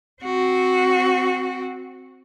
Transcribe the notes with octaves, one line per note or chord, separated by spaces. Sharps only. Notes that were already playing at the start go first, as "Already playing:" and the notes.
C4 F#4